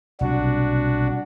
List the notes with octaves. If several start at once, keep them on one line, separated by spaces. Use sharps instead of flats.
B1 C3 G3 D4 F#4